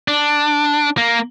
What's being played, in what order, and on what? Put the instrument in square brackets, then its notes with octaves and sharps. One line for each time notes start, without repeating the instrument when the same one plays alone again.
[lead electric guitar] D4
A#3